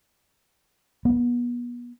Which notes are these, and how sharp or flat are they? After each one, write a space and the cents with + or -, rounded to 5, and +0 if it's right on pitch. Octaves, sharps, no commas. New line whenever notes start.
B3 -35